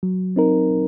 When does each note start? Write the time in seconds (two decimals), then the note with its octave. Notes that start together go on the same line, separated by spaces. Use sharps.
0.03 F#3
0.36 C4 D#4 A#4